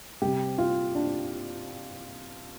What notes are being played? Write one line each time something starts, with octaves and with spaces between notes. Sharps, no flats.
C3 G3 G4
F4
D4